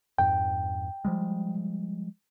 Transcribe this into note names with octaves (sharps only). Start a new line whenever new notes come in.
F2 G#2 G5
F3 G3 G#3